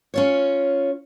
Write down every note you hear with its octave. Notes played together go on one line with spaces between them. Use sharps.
C#4 F4 C#5